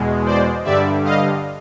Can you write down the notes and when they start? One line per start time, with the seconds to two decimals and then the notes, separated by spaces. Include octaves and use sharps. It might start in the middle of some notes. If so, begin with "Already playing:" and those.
Already playing: E2 B2 G#3
0.26 C5 D5
0.64 G2 D3 G3 D5 E5
1.05 D#5 F5